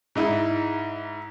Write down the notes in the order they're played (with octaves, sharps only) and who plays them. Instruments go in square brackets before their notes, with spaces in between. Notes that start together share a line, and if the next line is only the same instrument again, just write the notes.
[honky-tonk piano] G#2 D#4 E4